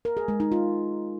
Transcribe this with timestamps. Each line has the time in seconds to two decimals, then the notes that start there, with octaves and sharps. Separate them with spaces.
0.05 A#4
0.17 G#4
0.28 G#3
0.40 D#4
0.52 F4